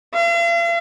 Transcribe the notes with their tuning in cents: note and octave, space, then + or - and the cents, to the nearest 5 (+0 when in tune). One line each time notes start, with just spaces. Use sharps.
F5 -45